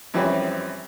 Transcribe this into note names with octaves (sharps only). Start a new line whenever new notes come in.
F#2 E3 F3 G3 C4 C#4